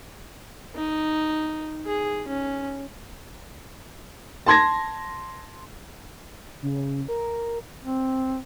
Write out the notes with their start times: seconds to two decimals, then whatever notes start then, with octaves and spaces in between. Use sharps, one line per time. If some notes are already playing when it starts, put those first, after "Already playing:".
0.75 D#4
1.86 G#4
2.28 C#4
4.46 A5 C6 G#6 A#6
6.63 C#3
7.08 A#4
7.83 C4